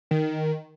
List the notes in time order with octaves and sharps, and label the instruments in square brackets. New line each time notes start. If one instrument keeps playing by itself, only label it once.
[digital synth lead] D#3